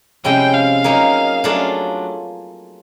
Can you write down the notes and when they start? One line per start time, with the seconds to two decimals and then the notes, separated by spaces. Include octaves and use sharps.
0.24 C3 F3 G#3 C#4 E4 G5
0.54 F5
0.84 F#3 A#3 D#4 G#4
1.44 F#3 A3 D4 F4 G#4